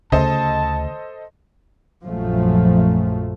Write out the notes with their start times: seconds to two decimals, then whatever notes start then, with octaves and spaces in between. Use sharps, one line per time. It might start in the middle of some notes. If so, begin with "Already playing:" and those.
0.12 D2 C#3 A4 C5 D#5 A5
2.05 A#1 F#2 F3 A3